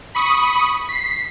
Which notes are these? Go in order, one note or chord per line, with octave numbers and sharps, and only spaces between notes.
B5 C#6 D#6
B6 C7